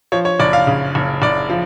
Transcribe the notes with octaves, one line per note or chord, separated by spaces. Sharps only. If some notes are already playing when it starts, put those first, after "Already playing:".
F3 C#5
C#5
F#1 D5
F5
C#3
F#1
F#1 D5
F3